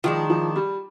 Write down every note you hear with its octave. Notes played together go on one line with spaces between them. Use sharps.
D#3 F3 G#3 D4
F3
G3